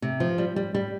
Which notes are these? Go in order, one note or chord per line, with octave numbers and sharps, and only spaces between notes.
C3
F3
G3
G3
G3